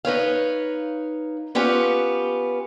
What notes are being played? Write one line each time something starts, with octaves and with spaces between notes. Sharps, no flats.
D#4 B4 C#5 F5
B3 C#4 F4 G4 B4